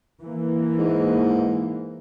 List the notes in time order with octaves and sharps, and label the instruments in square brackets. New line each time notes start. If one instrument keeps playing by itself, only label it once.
[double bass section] E3 A#3
[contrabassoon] G#2